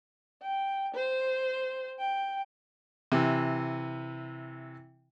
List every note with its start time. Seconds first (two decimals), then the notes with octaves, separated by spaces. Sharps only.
0.42 G5
0.94 C5
1.99 G5
3.12 C3 E3